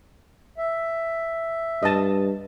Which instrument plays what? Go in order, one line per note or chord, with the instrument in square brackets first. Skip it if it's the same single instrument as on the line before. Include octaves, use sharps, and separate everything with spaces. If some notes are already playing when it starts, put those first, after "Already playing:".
[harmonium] E5
[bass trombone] G2 [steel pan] D#5 A5